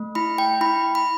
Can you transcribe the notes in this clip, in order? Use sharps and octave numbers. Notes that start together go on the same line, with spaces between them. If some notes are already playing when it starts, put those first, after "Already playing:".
Already playing: A3
E4 B5
G5
E4 B5
B5